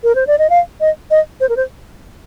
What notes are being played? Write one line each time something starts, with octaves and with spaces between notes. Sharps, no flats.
A#4
C5
D5
D#5
F5
D#5
D#5
C5
A#4
C5